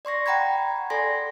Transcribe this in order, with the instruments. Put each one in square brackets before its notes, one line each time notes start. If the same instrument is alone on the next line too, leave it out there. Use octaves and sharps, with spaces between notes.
[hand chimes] D5 C6 C#6 A#6
F#5 G5 A#5 B5 G#6
A4 D5 G#5 C6 A#6